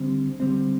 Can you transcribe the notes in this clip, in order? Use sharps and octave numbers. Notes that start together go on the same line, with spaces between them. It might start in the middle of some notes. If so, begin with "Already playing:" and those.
Already playing: D3 G3 C4
D3 G3 C4